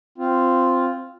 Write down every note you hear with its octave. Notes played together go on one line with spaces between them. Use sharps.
C4 F4